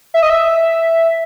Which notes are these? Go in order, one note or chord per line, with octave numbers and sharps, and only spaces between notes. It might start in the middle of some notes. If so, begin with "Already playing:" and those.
E5
D#5
E5